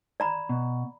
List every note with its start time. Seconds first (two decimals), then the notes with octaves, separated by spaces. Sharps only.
0.20 D5 A#5 B5
0.49 B2